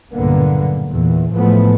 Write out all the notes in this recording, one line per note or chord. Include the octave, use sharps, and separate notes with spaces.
B1 G2 A#2 D3 A#3 B3
E2 A#2 E3
A2 E3 F3 G#3 A3 B3